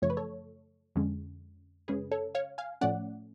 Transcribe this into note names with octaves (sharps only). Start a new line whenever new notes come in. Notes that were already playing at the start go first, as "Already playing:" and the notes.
F#2 C#3 F3 A3 C#5
B4
A4 C#5
F2 D3 G#3 C#4
F#2 C#3 G#3 C#4 G#4 B4
A4 C#5
C#5 F5
F5 G#5
A2 F3 A3 C#4 D5 F#5